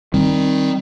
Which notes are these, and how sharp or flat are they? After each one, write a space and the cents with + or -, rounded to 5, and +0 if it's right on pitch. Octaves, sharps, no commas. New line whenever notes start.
D#3 +0 G3 +0 C4 +15